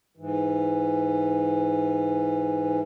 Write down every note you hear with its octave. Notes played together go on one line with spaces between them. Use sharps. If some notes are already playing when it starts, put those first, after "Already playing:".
G#2 E3